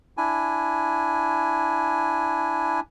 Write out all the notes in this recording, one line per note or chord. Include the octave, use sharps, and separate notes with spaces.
D4 E4 G#5